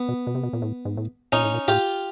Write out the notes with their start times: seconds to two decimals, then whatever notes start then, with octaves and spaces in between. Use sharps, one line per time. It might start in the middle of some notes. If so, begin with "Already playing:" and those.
Already playing: B3
0.09 B2
0.27 B2
0.35 C3
0.43 B2
0.53 A#2
0.62 A2
0.85 G#2
0.97 A2
1.32 A#2 C#4 D#4
1.43 A2
1.54 A#2
1.68 A2 F4 G4